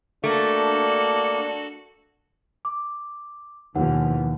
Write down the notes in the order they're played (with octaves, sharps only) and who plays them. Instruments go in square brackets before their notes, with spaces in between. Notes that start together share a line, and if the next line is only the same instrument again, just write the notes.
[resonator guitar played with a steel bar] A3 [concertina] A#3 [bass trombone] D4 [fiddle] F#4 A4
[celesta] D6
[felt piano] D#2 [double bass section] B2 E3 F3 [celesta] F#5